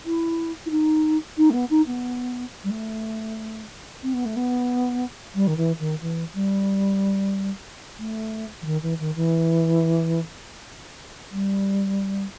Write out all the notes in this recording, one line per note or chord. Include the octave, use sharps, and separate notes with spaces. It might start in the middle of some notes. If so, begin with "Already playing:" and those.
E4
E4
D#4
D#4
A3
B3
D#4
B3
G3
A3
C4
B3
A3
B3
G3
D#3
E3
D#3
E3
G3
A3
E3
D#3
E3
D#3
E3
G3